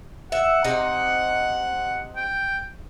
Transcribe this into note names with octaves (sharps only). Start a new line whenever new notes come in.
E5 F#5
C3 D#4
G5